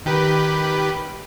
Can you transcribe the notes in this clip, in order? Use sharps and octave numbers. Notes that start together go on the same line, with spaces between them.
D#3 G4 B4